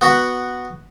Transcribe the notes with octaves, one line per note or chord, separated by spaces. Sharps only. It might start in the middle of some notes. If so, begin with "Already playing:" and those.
B3 F#4 B5